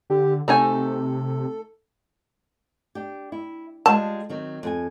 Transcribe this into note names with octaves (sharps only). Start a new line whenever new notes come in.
D3 G4
C3 A3 D#4 A4 G#5
D4 G4
E4
G3 G#3 F4 A5
D#3 F#3 C4
F2 F4 G#5